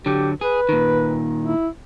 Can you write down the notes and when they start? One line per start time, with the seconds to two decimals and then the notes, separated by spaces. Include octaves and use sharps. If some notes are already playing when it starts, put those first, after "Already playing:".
0.06 D3 F#3 G4
0.41 G#4 B4
0.69 A#2 D#3
1.42 E4